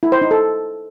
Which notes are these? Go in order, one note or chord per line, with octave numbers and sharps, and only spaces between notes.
E4
C5
D#4
A4